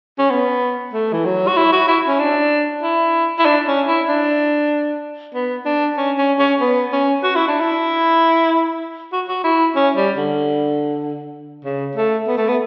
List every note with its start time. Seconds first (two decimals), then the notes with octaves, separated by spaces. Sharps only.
0.19 C#4
0.31 B3
0.93 A3
1.13 E3
1.25 F#3
1.48 F#4
1.57 E4
1.72 F#4
1.88 E4
2.08 C#4
2.19 D4
2.83 E4
3.39 E4
3.45 D4
3.66 C#4
3.87 E4
4.08 D4
5.35 B3
5.66 D4
5.98 C#4
6.18 C#4
6.39 C#4
6.61 B3
6.92 C#4
7.23 F#4
7.36 E4
7.48 D4
7.60 E4
9.13 F#4
9.28 F#4
9.44 E4
9.76 C#4
9.97 G3
10.17 D3
11.65 C#3
11.96 A3
12.27 B3
12.38 A3
12.48 B3